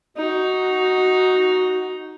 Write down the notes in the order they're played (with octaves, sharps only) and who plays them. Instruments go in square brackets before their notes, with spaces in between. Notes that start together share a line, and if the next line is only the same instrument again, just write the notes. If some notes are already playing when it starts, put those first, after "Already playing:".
[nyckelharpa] D#4 [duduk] F#4